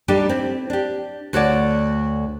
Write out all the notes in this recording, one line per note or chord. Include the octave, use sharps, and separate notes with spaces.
G3 D4 D#4 G4 A4
C4 E4
D4 G4
D2 F#4 A4 C#5 D5 F#5